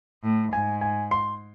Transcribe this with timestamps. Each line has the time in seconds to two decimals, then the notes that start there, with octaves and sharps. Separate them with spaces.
0.24 A2
0.53 G#2 G#5
0.81 G#5
1.11 C6